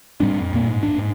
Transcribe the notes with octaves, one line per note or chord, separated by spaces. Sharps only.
A2 G3 C4 D4
F2
F2 A#2 A#3
G#2
D1 G#1 D4
G#2